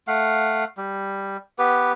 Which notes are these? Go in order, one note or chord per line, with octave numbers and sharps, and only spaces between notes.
A3 F5 F#5
G3
B3 G4 B4